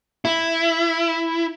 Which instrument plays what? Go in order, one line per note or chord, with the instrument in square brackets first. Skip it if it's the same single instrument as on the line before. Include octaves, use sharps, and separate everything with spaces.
[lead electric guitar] E4